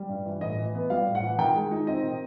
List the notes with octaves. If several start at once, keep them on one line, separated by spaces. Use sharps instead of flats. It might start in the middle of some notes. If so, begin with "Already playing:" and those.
Already playing: G3
G2
E3
A2 D#5
E3
B3
G3 F5
A2
F#5
E3
D#3 G5
G#3
D#4
C4 D#5
D#3